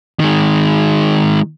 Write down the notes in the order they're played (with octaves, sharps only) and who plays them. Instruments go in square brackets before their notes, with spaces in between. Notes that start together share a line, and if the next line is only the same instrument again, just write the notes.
[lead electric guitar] D#3 G#3